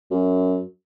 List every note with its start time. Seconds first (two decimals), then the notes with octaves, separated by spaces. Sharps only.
0.11 F#2